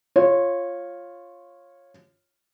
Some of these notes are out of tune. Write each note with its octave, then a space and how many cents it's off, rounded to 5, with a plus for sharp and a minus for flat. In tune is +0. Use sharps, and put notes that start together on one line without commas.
F4 +0 C#5 -15